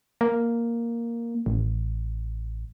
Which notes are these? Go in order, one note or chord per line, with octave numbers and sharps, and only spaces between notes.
A#3
A1